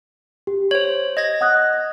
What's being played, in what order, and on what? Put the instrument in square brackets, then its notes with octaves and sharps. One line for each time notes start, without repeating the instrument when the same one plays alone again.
[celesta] G4
[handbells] C5 C#5 [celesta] F#7
[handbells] D#5 G#6 A#6
[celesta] F#5 D#6 F#6